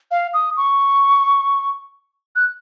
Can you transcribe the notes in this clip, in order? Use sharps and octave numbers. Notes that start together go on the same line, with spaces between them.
F5
D#6
C#6
F#6